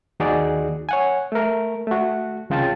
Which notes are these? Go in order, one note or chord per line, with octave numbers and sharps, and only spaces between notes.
D#2 D#4 F#4 G#4 D5
C#5 F#5 G#5
A3 A#4
A3 F#4
C2 C#3 F4 G5 A5 A6